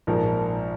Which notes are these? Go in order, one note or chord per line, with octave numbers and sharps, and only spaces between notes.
A#1 G#2 F3 A#4